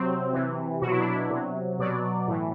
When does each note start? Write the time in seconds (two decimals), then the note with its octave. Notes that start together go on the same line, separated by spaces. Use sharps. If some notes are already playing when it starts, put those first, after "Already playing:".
Already playing: C3 F#3 C4
0.33 C3 E3
0.81 B2 F#3 F#4
0.91 E4
0.99 D4
1.09 E4
1.30 C3 F#3
1.79 B2 F#3 D5
2.28 A2 E3